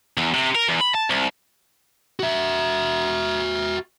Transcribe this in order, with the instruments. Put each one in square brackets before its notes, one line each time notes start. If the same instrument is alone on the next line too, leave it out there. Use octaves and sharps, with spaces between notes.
[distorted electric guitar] E2
C3
A#4
E2
B5
A5
C2
[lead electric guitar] F#4 E5